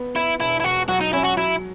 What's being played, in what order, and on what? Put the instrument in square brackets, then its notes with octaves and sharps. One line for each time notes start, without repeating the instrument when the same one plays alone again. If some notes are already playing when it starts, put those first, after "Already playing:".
Already playing: [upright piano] B3
[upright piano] B3 [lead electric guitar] E4
[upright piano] E1 [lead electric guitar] E4
[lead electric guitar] E4
[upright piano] E1 [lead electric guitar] F#4
[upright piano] F#3 [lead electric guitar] F#4
[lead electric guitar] D#4
[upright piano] C#4 [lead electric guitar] E4
[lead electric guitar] F#4
[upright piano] F#3 [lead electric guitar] E4